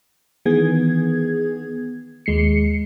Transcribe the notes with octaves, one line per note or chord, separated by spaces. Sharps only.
D#3 E3 B3 G#4 G#6
D#2 G#3 C7 C#7